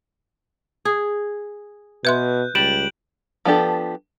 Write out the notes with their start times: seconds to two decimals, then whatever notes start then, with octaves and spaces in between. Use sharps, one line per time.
0.85 G#4
2.05 B2 B4 E5 C6 F#6 G6
2.55 C#2 G3 D7 E7 F#7
3.45 F3 B3 D4 G4 A4